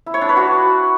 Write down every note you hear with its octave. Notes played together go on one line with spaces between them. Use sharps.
E4
C#5
D4
B4
F#4